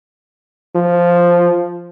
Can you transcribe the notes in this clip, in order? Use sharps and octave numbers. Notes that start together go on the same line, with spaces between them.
F3